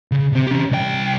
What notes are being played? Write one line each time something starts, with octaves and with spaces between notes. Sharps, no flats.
C#3
C3 C4
C#4 G4
C2 G5